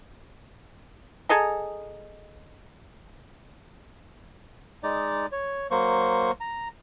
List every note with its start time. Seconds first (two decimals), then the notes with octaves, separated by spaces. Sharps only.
1.29 G#4 A4 D#5 A#5
4.83 G#3 D#4 D5
5.32 C#5
5.71 F#3 A#3 C5 C#6
6.40 A#5